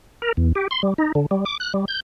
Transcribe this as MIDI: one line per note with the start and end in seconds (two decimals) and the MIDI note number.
0.22 0.32 70
0.37 0.52 40
0.55 0.68 67
0.71 0.82 84
0.83 0.94 55
0.98 1.12 63
1.15 1.26 50
1.31 1.45 55
1.45 1.57 86
1.60 1.73 90
1.74 1.85 55
1.88 2.00 91